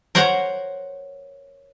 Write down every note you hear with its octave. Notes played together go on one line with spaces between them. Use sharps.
A#4 C5 C#5 F#5